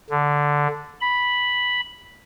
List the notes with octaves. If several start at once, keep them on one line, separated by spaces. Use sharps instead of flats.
D3
B5